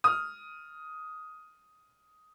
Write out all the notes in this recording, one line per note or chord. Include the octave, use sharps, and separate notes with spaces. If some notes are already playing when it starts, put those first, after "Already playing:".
D#6 F6